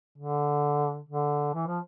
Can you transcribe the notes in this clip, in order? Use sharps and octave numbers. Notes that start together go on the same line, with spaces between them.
D3
D3
E3
F3